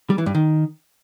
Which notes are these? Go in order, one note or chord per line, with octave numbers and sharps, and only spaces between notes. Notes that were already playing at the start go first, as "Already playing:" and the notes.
G3
E3
G2
D#3